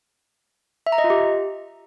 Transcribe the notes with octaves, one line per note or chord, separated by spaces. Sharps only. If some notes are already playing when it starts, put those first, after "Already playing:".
E5
A#5
D#5
F4
G4